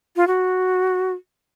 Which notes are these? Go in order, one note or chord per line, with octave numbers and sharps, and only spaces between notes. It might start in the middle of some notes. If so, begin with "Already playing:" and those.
F4
F#4